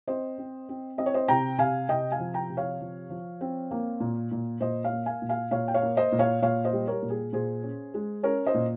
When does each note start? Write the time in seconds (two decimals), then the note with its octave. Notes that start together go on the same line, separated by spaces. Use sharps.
0.07 C4 C5 D#5
0.38 C4
0.69 C4
0.98 C4 D#5
1.06 C#5
1.14 C5 D#5
1.28 C3 G5 A#5
1.58 C3 F5 G#5
1.89 C3 D#5 G5
2.12 F5 G#5
2.19 F3
2.34 G5 A#5
2.50 C3
2.57 C#5 F5
2.80 F3
3.10 F3
3.41 C4
3.71 A#3
4.00 A#2
4.31 A#2
4.61 A#2 C5 D#5
4.84 C#5 F5
4.92 A#3
5.06 F5 G#5
5.22 A#2
5.29 F5 G#5
5.51 A#2 C#5 F5
5.68 G5
5.74 C#5 F5
5.82 A#3
5.97 C5 D#5
6.12 A#2
6.19 C#5 F5
6.42 A#2 C#5 F5
6.65 C5 D#5
6.73 G3
6.87 A#4 C#5
7.02 A#2
7.10 G#4
7.33 A#2 G#4 C5
7.63 C#4
7.94 G#3
8.23 C#4 A#4 C#5
8.46 C5 D#5
8.54 A#2